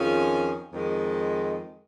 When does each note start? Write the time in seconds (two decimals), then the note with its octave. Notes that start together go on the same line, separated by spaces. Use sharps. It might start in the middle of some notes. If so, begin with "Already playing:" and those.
Already playing: F2 D#3 C#4 F4 G#4
0.72 F2 D#3 G#3